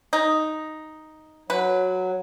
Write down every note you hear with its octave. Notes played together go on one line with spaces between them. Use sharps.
D#4
F#3 B4